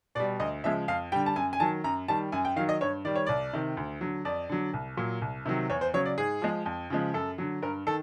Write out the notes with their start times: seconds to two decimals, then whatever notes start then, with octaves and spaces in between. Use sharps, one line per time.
0.15 B2 D5
0.20 G3
0.40 D2 D#5
0.64 C#3 F3 G#3 E5
0.88 F2 F5
1.12 D3 G3 G5
1.26 A5
1.36 F#2 G#5
1.53 G#5
1.60 D#3 F#3 A5
1.84 F#2 A#5
2.08 D#3 G3 A5
2.32 F#2 G#5
2.45 G5
2.56 D#3 F5
2.59 F#3
2.69 D#5
2.81 G2 C#5
3.05 D#3 G3 D5
3.16 C#5
3.27 C2 D5
3.53 C3 D#3
3.77 D2
4.01 D3 F#3
4.25 F2 D5
4.49 D3 F#3
4.73 C2
4.97 A#2 F#3
5.22 C2
5.45 C3 D#3 F#3
5.70 E2 C#5
5.81 C5
5.94 C#3 F#3 C#5
6.06 D5
6.18 G#2 G#4
6.42 F3 G#3
6.66 F2
6.90 C#3 F3 G#3
7.14 F#2 A4
7.38 D3 F#3
7.62 G2 A#4
7.87 D#3 A4